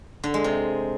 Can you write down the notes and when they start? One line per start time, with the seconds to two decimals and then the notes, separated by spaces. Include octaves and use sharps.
0.24 D3
0.34 G#3
0.44 C3